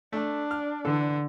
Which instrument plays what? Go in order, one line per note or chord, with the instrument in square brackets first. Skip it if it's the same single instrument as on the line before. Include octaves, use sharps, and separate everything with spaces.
[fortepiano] A3 [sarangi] D4
[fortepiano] F6
[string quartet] D3 [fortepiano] E3 A4